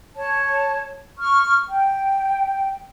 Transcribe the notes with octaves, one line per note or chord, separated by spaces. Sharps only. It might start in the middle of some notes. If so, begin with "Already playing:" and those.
C#5 A5
C#6 F6
G5